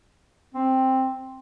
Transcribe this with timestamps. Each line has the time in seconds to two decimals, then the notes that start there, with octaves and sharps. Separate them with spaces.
0.54 C4